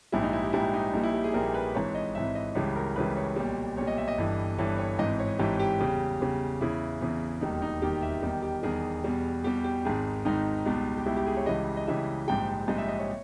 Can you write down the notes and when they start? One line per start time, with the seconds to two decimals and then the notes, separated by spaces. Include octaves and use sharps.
0.12 A#1 G#2 G3 E4
0.23 D#4
0.33 E4
0.43 G4
0.53 A#1 G#2 G3 E4
0.73 D#4
0.93 A#1 A#2 G3 D#4
1.03 E4
1.14 G4
1.24 G#4
1.34 A#1 A#2 G3 A#4
1.54 B4
1.75 G#1 G#2 E3 C#5
1.95 D#5
2.15 G#1 G#2 E3 E5
2.35 D#5
2.55 C#2 C#3 E3 G3 C#5
2.76 A#4
2.96 C#2 C#3 E3 G3 B4
3.17 C#5
3.36 B1 A#2 G3
3.77 B1 A#2 G3 C#5
3.87 D#5
3.98 E5
4.08 D#5
4.18 G1 G2 E3
4.58 G1 G2 E3 C#5
4.78 C#5
4.99 G#1 G#2 E3 D#5
5.19 C#5
5.39 G#1 G#2 E3 G4
5.59 G4
5.80 E2 C#3 G3
6.20 E2 C#3 G3
6.60 E2 C#3 E3 E4
7.01 E2 C#3 E3
7.41 E1 D#2 D#3 G3 D#4
7.62 D#4
7.82 E1 D#2 D#3 G3 G4
8.02 E5
8.23 E2 D#3 G3 G4
8.42 G4
8.63 E2 D#3 G3 G#4
9.04 E2 B2 G3
9.44 E2 B2 G3 G4
9.64 G4
9.85 G#1 G#2 D#3 G#4
10.25 G#1 G#2 D#3 D#4
10.66 C#2 B2 G3
10.97 G4
11.06 C#2 B2 G3 E4
11.17 G4
11.27 G#4
11.37 C#5
11.46 C#2 C#3 E3 G3 D#5
11.77 D#5
11.87 C#2 C#3 E3 G3 E5
12.28 A#1 G#2 G3 G5
12.49 G5
12.68 A#1 G#2 G3 D#5
12.78 E5
12.88 D#5
12.99 C#5